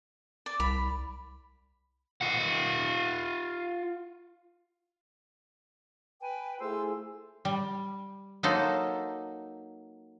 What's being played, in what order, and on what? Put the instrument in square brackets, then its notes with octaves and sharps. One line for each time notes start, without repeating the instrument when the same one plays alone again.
[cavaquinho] D5
[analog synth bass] C2 [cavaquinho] B5
[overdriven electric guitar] F4 F#5
[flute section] B4 G5 G#5
[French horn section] A3 E4 G#4 [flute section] F4 C5 E6
[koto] G3
F#3 A#3 D#4 A4 C5